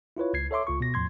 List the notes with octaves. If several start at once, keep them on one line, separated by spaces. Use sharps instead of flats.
E4 F4 B4 C#5
C#2 G#6 C7
A4 C#5 E5 C6 D6
C#2 F4 C#6
B2 A#6
E2 A2 F3 C6 G#6